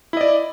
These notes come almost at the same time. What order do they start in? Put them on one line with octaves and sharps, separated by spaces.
E4 D#5 D5